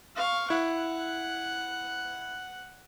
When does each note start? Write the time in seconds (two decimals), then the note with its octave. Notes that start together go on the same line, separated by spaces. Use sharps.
0.16 F5 C#6
0.50 E4 F#5